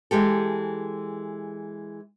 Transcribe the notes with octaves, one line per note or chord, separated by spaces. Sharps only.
E3 G#3 G4 A4